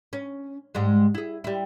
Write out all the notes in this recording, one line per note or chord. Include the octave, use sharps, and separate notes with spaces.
C#4
G#2 G3 G#3
E4 G#4
G3 E4